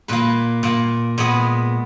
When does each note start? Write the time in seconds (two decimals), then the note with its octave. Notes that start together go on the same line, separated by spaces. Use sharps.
0.08 A#2 A#3 B4
0.63 A#2 A#3
1.18 A#2 G#3 B3